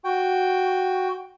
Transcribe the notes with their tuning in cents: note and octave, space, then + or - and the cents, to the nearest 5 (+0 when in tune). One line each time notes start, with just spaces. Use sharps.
F#4 +0 G5 +0